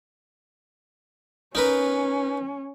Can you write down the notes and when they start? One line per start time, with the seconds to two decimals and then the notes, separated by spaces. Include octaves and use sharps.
1.55 C#4 D#4 A#4 B4